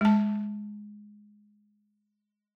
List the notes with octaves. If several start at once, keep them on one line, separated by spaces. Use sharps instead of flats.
G#3 A5